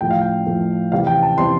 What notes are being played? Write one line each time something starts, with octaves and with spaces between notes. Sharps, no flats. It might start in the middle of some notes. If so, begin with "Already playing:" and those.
A2 F3 A3 G5
F5
G5
A2 F3 A3
C3 E3 G3 F5
G5
A5
C3 E3 G3 C6